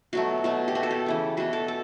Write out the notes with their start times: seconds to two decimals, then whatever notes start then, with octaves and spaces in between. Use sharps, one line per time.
0.13 B2 F#3 A3 F#4
0.44 B2 F#3 A3
0.68 G4
0.75 B2 A3 F#4
0.83 A4
0.91 G4
1.06 C#3 E3 A3
1.37 B2 A3 F#4
1.53 A4
1.68 A4